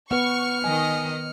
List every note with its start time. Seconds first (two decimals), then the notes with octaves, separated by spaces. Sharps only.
0.11 B3 B4 F#5 C#6 F6 C#7
0.64 D#3 D#5 G#5